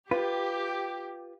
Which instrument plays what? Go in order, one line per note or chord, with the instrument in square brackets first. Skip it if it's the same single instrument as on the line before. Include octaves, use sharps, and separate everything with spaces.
[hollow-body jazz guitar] F4 B4 [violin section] G4